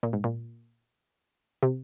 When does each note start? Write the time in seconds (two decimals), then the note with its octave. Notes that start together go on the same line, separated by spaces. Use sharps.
0.03 A#2
0.13 G#2
0.24 A#2
1.63 C3